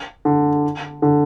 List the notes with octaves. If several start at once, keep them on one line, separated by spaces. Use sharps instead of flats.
D3
D3